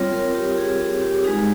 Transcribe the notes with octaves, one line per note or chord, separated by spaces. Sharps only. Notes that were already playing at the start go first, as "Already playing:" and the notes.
Already playing: G3 C4 F4 C#5
A#4
G4
G#4
G4
G4
G#3 D#4 G#4